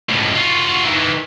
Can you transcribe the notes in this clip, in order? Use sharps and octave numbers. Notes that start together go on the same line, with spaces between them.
C#2 A2
F4 F#4
D#3 E3